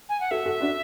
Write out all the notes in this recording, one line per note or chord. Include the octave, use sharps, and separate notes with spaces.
G#5
F#5
F#4 A4 E5
F#4 A4
D4 F#4